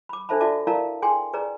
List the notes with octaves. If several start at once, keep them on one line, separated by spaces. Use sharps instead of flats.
B5 D6
D4 A4 C5 E5 A5 B5
F#4 D5 E5 A5 D6
E4 A#4 D5 F5 A5 A#5
G#4 G5 G#5 C6
G#4 B4 D5 A#5